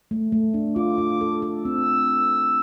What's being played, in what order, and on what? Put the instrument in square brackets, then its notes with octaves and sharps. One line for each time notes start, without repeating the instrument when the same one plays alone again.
[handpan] A3
A3
D4
[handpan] F4 [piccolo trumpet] D6
[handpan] F4
A4
A4
[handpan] C4 [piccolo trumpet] E6